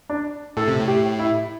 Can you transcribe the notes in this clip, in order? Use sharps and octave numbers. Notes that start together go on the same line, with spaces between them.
D4
A2 A4
C3
A2
G4
E4